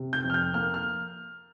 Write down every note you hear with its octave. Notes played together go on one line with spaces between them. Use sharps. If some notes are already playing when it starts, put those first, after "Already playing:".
Already playing: C3
G6
F2
F6
G6
A#3 F6
F6